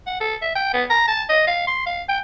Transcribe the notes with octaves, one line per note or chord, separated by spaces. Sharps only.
F#5
A4
E5
G5
B3
A#5
A5
D#5
F5
C6
F5
G5